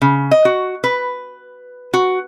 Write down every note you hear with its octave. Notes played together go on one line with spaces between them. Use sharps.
C#3
D#5
F#4
B4
F#4